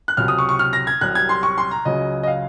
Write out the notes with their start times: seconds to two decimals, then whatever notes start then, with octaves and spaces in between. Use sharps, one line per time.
0.08 F#6
0.17 C#2 C3 F#3 F6
0.28 D#6
0.39 C#6
0.49 C#6
0.59 F6
0.73 A#6
0.87 G#6
1.01 C2 C3 F#3 F#6
1.15 G#6
1.29 C6
1.43 C#6
1.58 C6
1.71 A#5
1.85 C#2 C#3 F#3 D#5
2.23 D#5
2.27 F5